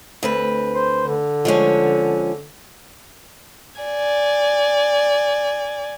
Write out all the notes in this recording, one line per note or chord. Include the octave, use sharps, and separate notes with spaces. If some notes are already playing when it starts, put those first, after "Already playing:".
D2 C4 B4
C5
D3
F3 G#3 C#4
D5 G#5